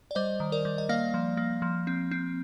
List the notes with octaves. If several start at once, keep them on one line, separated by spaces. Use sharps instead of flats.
D5
G3 C5 D#5
D#3
A#4 D5
G3
D#5
A#3 D5 F5
F3
A#3
F3
C4
C4